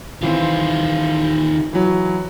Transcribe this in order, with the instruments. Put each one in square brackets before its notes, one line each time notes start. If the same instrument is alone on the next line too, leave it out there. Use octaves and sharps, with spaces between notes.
[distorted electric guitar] D#3 F4 [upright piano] E3 C4
[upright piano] E3 F#3